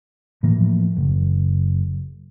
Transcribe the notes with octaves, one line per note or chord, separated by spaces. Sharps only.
A2 E3 F3 A#3
F#1